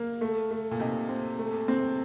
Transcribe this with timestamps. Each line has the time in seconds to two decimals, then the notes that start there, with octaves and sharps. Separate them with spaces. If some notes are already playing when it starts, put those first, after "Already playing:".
Already playing: A#3
0.21 A3
0.51 A3
0.71 A#2
0.80 C3 D#4
1.09 C4
1.39 A3
1.68 C4